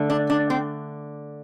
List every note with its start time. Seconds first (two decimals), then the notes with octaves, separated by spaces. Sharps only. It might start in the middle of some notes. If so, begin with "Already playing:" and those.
Already playing: D3 A3
0.10 D4
0.30 D4
0.50 C4